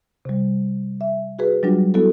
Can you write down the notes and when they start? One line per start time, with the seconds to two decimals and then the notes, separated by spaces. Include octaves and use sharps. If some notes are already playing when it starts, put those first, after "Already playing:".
0.25 C3 G3
1.01 E5
1.39 F#4 G#4 B4
1.63 F#3 G3 D4 F4 F#4
1.94 B3 E4 F#4 A4